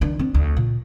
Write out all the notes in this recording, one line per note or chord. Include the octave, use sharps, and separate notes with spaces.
D#3 D4
C4 D4
D2
A#2